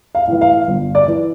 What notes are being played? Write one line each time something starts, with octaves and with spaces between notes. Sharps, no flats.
F5
A2 E3
F5
G1
D5
E3